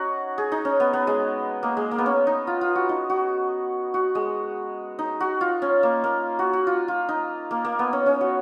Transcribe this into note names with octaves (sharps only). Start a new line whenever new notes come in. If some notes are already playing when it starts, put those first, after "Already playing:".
Already playing: C#4 D#4 F#4
G#4
D#4
C#4
B3
B3
G#3
A#3
G#3
A#3
B3
C#4
D#4
F4
F4
F#4
D#4
F#4
F#4
G#3
D#4
F#4
F4
C#4
A#3
A#3
F#4
F#4
F4
F4
D#4
A#3
A#3
B3
C#4
C#4
F#4